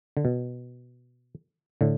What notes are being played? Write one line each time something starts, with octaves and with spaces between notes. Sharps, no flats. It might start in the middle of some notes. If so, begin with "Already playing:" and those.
D3
B2
A2 D3